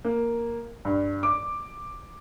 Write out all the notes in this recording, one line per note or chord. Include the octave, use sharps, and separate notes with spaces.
A#3
G2
D6